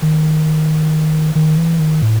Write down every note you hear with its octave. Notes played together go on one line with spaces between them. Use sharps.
D#3
D#3
E3
D#3
A2